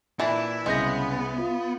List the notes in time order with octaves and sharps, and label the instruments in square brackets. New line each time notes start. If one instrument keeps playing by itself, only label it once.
[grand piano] A#2 [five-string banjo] E3 D4 [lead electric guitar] E4
[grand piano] C2 G6 A#6 [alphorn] C#3 [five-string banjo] G#3 [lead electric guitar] B3
[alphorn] F4